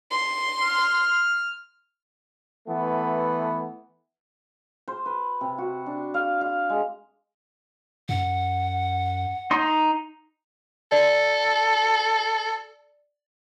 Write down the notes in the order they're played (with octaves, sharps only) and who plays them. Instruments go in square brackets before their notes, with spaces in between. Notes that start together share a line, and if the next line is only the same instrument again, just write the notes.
[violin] C6
[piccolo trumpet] F6
[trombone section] E3 A3 B3
[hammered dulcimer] C5
B4
C3
F#4
D4
F5
F5
G#3
[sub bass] F#2 [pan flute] F#5
[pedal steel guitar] D#4 C6
[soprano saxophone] A4 [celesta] D5